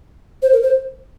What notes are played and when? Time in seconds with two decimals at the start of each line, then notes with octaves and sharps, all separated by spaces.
0.42 C5
0.53 A#4
0.63 C5